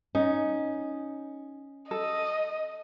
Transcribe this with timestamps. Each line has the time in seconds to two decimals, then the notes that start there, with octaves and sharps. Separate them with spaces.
0.15 C#4 D#4
1.91 A4 D#5